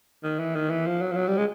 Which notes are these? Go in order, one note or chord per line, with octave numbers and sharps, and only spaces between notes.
D#3
E3
D#3
E3
F3
F#3
F3
F#3
G3
G#3